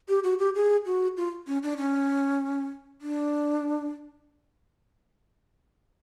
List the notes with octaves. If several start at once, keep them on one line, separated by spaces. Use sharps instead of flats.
G4
F#4
G4
G#4
F#4
F4
C#4
D4
C#4
D4